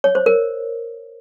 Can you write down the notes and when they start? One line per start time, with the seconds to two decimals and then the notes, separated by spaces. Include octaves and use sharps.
0.04 C#5
0.15 C5
0.26 A#4